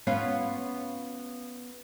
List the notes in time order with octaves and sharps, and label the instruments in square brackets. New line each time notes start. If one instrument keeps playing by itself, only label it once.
[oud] B3 C#4 F4